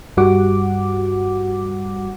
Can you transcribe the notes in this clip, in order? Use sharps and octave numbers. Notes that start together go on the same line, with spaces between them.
G2 G3 F#4 F#5 D6